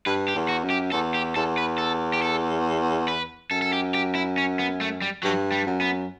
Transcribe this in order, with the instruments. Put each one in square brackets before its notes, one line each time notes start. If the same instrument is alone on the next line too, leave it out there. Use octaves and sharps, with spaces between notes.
[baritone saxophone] G2 [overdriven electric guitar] B4
[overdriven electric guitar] G4
[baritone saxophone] E2
[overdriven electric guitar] F#4
[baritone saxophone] F#2
[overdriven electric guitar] G4
[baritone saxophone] E2 [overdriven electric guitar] A4
[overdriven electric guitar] G4
[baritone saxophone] E2 [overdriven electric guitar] A4
[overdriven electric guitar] B4
A4
G4
A4
B4
[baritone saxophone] F#2 [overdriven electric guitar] A4
[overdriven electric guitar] A4
G4
G4
E4
C#4
B3
A3
G3
[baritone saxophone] G2 [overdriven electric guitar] F#3
[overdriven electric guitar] G3
[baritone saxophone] F#2
[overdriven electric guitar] B3